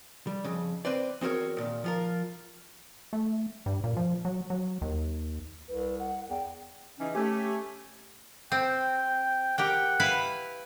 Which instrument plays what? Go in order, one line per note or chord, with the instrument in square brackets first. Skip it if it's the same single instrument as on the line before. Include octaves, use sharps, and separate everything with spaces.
[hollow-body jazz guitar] G3
F2 C#3
C4 B4 C5 D5
E2 C4 F#4 A#4 C#5
A#2 D#3
F3 F4 A#4
[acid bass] A3
G2
A#2
F3
F#3
F#3
D#2
[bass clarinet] C2 [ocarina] B4
[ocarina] F#5
[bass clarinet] E2 [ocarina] G5
[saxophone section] C#3 E3 D#4 [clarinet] C#4
[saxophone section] A3 [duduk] C#4 [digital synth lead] G4 [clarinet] G#5
[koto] C4 [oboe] G5
[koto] G4 A#4 G5 [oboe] F#5
[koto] E4 B4 F5